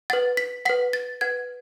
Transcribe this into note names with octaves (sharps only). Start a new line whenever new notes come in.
B4 F#5 A6
B6
B4 F#5 B6
A6
B4 F#5 G#6